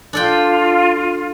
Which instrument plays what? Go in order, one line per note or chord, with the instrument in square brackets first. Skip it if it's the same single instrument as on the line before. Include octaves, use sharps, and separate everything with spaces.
[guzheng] D4 A4 G5 [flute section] F4